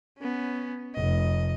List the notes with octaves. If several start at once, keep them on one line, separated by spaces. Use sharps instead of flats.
B3 C#4
F1 D#5